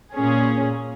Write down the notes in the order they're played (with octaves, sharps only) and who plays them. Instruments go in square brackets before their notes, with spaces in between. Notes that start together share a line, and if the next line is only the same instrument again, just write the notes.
[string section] A#2 C#4 G#4